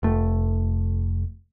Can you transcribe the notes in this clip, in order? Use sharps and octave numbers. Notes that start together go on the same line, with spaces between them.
F1 A3